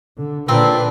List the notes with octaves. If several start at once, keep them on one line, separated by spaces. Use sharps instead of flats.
D3
A#2 D3 C4 D4 B4